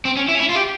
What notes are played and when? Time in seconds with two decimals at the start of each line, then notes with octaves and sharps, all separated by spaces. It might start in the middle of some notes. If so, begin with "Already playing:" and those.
0.05 C4
0.17 C#4
0.28 E4
0.35 C#4
0.40 E4
0.50 F4
0.55 G4